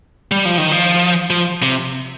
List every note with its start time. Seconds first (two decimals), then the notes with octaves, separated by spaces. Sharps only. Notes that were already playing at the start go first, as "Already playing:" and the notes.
0.31 G3
0.45 F3
0.58 D#3
0.72 F3
1.30 F3
1.63 C3